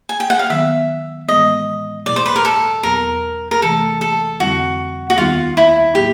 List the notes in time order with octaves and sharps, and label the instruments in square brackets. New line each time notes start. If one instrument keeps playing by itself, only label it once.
[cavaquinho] G#5
G5
F#5
F5
[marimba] D#3 F#3 B3 [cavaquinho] E5
[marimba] A2 E3 G#3 B3 [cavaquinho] D#5
[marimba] E2 B2 F#3 B3 E4 [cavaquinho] D5
[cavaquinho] C5
B4
A#4
A4
[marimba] E2 B2 F#3 B3 [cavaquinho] A#4
[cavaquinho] A#4
[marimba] C3 E3 A3 [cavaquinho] A4
[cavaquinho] A4
[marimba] F2 D3 G3 C4 E4 [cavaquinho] F#4
[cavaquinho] F#4
[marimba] D#2 D#3 G3 B3 D#4 [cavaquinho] F4
[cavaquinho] E4
[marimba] A2 F#3 A#3 [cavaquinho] G4